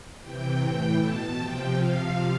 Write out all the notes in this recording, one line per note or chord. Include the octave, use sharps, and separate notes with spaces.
C3 E3 G5
A2 E3 G5
B2 A5
C3 F3 G5
C3 F3 F5